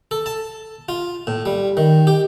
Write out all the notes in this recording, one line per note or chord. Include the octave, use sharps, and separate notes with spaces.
A4
A5
F4
A2
G3
D#3
G4